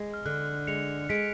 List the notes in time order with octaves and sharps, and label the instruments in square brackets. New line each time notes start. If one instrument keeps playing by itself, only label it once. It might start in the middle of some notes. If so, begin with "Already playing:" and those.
Already playing: [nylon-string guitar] G#3
[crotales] F6
[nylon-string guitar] D3 [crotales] F#6
[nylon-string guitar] G#3 [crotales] C#7 F7
[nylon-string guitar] G#3 [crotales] B6 D7